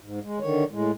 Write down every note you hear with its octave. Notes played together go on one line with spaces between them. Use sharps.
G#2
G#3
D3 D#3 C#5
A2 G#3